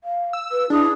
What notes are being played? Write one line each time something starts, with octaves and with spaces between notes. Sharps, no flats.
F5
E6
B4
D4 E4 G#4